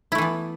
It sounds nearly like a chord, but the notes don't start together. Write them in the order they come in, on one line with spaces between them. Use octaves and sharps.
E4 A3 E3 B3